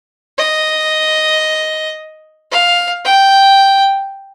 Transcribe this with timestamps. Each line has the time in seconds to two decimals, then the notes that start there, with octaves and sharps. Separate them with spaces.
0.38 D#5
2.52 F5
3.05 G5